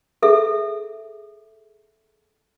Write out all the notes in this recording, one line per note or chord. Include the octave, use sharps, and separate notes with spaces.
G#4 A4 E5